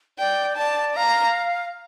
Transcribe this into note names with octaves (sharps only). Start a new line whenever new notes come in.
D5 G5
D5 A5
F5 A#5